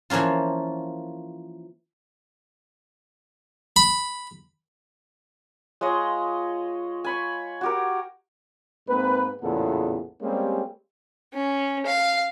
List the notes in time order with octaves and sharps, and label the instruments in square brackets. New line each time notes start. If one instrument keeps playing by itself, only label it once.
[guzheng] E3 F3 A#3 C#4 F4
[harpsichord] B5
[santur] G#3 F4 C#5 D#5
G#5 B5 C#6
F#4 G4 A#4
[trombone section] G#2 A#3 C4 B4
A1 E2 A#2 C#3 B3 A4
G3 G#3 A#3 C4 C#4 G4
[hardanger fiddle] C#4
F5